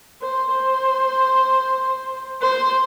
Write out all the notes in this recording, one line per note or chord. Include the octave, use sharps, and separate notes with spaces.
C5
C5
C5